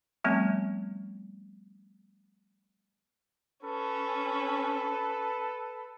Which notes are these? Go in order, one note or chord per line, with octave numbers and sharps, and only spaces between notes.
F3 G3 A3 B3 C4
C#4 A4 B4